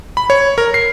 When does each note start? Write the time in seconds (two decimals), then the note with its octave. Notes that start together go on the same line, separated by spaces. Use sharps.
0.17 B5
0.30 C#5
0.58 A#4
0.74 C7